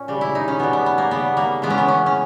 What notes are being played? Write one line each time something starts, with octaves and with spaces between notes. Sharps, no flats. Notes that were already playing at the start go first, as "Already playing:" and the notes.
Already playing: A#2 C#4
C#3 G3
E4
D#4
C#4
B2 G3 B3
B3
B3
A#3
C#3 G3 B3
A#3
C#3 E3 G#3 B3
C#4
B3
C#4
C#4